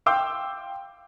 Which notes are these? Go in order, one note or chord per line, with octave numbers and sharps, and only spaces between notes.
F5 G5 C6 D6 E6 G6